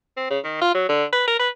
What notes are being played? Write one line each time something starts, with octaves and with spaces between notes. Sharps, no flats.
C4
C#3
D#3
F4
F#3
D3
B4
A#4
B4